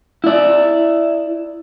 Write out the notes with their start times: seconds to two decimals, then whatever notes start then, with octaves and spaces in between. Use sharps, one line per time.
0.24 E4 D5